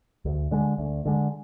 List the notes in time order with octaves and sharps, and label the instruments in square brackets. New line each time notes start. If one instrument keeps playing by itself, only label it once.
[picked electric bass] D2
D3 G#3
D2
D3 G#3